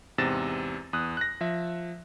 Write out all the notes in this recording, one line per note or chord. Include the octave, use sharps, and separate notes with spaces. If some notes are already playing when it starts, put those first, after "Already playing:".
E2 G#2 C3 A6 A#6 E7
E2 D#6 F#6
F#6 A#6
F3 E5